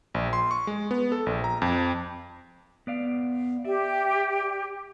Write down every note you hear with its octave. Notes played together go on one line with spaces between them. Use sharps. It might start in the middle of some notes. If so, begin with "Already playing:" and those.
A#1
C6
C#6
G#3
B3
A4
A#1
A#5
F2
B3 D5 F5
G4 D5 E5